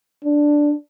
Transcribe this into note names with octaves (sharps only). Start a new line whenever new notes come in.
D4